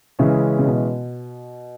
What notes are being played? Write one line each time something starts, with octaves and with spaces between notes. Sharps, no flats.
C#3 E3 G#3 C#4 E4
C#3
B2